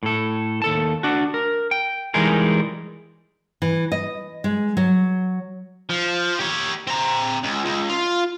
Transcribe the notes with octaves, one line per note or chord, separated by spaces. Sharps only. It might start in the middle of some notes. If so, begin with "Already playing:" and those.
A2 A4
D#2 A4 A5
D4 F#4
A#4
G5
E3 G3 G#3 D#4 G#4 A#4
E3
D#5
G#3
F#3
F3
G4 C#5
C4 A#5
C#2
C#2
F4